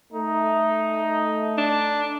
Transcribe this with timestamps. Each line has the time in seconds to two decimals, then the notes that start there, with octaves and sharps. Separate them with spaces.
0.13 A3 D#4
1.58 D4